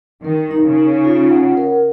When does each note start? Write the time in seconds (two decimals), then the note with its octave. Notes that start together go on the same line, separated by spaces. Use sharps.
0.24 D#3 A#4
0.51 D#4
0.64 C#3
0.78 D#4
1.04 F4
1.30 F#5
1.57 A#4